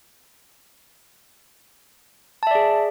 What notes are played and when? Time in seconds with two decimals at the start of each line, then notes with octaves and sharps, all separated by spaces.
2.43 A5
2.47 E5
2.51 D5
2.55 G#4